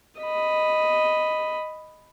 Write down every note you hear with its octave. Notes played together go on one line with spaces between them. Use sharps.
D#5 B5